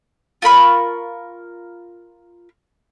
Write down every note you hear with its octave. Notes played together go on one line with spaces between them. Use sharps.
F4 A#4 B5 C#6